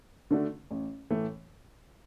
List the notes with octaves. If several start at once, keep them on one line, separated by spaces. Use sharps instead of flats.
D3 A3 D4 F#4
A1
A2 E3 A3